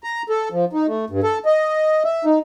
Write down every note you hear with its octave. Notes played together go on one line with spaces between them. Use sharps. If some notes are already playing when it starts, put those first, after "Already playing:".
A#5
A4
F3
D#4
A3
G2
A4
D#5
E5
D#4